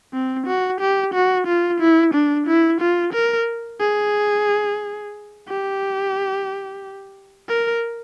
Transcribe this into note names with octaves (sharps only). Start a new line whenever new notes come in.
C4
F#4
G4
F#4
F4
E4
D4
E4
F4
A#4
G#4
G4
A#4